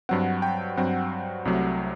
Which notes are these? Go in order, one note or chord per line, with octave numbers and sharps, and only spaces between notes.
G2 F#3 C4 F#5
G5
G2 F#3 C4 F#5
C2 C3 F#3 A3